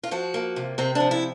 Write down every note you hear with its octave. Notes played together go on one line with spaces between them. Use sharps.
F4
F3 F#4
A#3
C3
C3 C4
F3 D4
E4